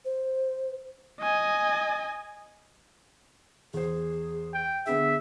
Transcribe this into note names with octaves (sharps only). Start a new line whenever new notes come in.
C5
D#5 G#5
E2 G#4 C5
G5
D3 B3 D4 G#4 E5